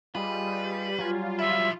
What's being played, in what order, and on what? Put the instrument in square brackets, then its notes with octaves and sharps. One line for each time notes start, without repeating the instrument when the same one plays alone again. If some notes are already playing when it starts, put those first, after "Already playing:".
[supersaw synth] G3 [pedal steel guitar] F4 G#4 D#5 [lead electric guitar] B4
[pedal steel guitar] F#3 G3 G#5 [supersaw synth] F4
[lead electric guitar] F3 E4 [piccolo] E5